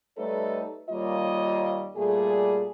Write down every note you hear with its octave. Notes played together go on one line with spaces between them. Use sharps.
G3 A3 D#4 A4 B4 C#5
D#2 G3 A#3 F4 C#5 D#5
A#2 G3 A3 G#4